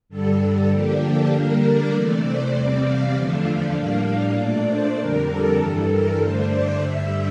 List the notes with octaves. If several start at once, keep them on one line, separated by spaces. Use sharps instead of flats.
G2 D3 G3 A4
D3 F3 A#3 D4 G4
A4
D3 G3 A#3 D4 A#4
D5
C3 E3 A3
C5
E2 C3 G3 C4 D5
F5
E2 D3 F3 A3 D4
A2 G3 A#3 D4 F5
A#2 A3 D4 D5
C5
F2 D3 G3 D4 A#4
A4
G2 E3 G3
A#4
G2 D3 A3 D4 C5
D5
G2 D3 G3 E5